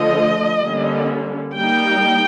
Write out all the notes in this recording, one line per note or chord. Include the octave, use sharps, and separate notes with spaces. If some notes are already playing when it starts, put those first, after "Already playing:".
Already playing: D3 F3 A3 D#5
D3 G3 A#3 C#4
G3 A#3 D#4 G5